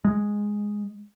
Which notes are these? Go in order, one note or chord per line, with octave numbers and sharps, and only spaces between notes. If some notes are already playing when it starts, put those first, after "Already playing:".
G#3